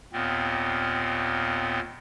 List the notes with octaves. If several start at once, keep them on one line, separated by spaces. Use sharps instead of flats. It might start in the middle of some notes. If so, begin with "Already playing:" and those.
D#2 A#2 B3 C4